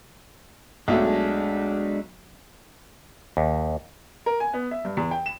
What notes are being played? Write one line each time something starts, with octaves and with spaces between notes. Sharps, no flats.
B1 F#3 G#3 A3 D4
D#2
A#4
G#5
B3
E5
G2
E2
G5
E7